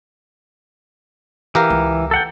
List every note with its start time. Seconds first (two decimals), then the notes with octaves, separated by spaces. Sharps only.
1.55 E3 G4 A#4 F5
1.70 C#2
2.11 A4 F#5 G5